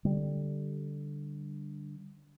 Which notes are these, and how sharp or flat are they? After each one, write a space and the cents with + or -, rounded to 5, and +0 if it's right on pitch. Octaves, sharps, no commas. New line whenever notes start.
D3 +0 G3 +0